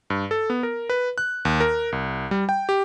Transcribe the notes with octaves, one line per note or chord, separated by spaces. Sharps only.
G2
A4
B3
A#4
B4
F#6
D#2
A#4
C2
G3
G5
G4